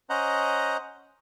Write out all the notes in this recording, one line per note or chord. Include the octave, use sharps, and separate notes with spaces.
C#4 C5 D#5 F#5 A#5